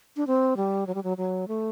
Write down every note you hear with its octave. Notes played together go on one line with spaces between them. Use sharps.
D4
C4
G3
F#3
G3
F#3
F#3
A3